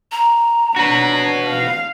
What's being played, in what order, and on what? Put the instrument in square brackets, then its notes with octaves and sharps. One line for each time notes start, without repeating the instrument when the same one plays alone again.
[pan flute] A#5
[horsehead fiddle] D4 C#5 [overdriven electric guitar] F#4 B4
[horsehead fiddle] F5